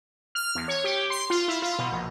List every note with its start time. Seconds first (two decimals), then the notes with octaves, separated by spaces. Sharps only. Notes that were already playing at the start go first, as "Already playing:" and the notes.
0.35 F6
0.55 E2
0.68 C#5
0.84 G4
1.10 C6
1.30 F4
1.48 E4
1.62 F4
1.79 B2
1.92 A#1